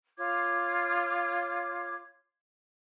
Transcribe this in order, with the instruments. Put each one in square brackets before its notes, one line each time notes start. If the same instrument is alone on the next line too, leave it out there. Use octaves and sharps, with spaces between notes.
[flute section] F4 C#5 D6 G#6